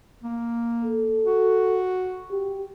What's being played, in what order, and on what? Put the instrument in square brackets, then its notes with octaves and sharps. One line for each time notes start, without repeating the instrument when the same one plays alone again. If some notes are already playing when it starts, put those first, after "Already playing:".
[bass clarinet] A#3
[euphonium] A4
[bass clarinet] F#4
[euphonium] G4